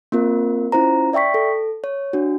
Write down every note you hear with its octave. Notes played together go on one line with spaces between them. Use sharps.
A#3 C4 F4 A#4
C#4 E4 F4 C5 A#5
D5 E5 G5 C#6 B6
A4
C#5
D4 F#4